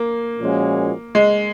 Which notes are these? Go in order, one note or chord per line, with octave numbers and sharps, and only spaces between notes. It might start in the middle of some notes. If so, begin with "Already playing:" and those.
Already playing: A#3
A#2 F3 G#3 C#4 F#4
G#3